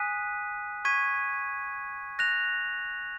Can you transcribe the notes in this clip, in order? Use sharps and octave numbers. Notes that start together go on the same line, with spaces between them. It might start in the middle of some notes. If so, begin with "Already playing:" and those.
Already playing: G#5 D#6 F#6 B6 D#7
C#6 G#6 B6 D#7
F#6 A#6 F7